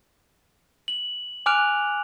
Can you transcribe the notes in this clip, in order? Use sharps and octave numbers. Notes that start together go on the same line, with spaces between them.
F#7
G#5 D6 F6 F#6 D7 F7